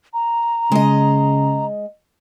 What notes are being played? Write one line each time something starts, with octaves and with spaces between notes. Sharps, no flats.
A#5
C#3 G#3 D#5